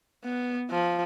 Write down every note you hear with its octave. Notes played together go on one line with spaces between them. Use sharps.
B3
F3